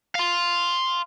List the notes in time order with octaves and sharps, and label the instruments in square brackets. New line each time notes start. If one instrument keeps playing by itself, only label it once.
[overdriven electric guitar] F5 C6